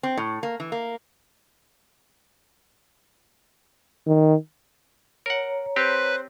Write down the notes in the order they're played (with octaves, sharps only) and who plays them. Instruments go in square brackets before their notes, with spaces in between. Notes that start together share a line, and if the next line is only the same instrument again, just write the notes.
[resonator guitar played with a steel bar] C4
A2
A#3
E3
A#3
[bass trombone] D#3
[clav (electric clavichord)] A#4 F#5 [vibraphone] C#5 A#5
[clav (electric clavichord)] C4 G4 [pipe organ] B4 [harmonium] C5